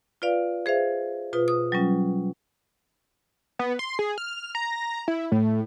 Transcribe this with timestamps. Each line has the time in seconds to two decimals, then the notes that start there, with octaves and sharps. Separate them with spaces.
0.22 F4 B4 D5 F5
0.66 G#4 C5 E5 F5
1.33 B2 F4 B4 D#6
1.48 D#6
1.72 F#3 G3 C#4 F4
3.59 B3
3.79 C6
3.99 G#4
4.18 F6
4.55 A#5
5.08 E4
5.32 A2